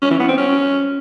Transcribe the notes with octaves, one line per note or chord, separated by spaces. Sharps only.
C#4
E3
B3
C4
C#4